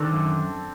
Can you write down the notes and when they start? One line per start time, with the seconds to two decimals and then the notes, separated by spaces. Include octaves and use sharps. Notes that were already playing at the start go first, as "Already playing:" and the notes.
Already playing: D#3 C4 D4 A4
0.13 F#2